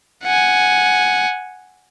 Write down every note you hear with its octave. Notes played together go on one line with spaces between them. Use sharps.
F#5 G#5